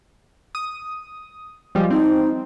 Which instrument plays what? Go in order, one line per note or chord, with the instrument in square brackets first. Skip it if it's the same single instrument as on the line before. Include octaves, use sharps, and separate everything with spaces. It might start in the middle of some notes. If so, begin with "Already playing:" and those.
[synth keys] D#6
F3 G3 G#3
[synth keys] C4 [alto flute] D#4